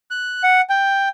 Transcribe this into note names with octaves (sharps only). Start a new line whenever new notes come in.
F#6
F#5
G5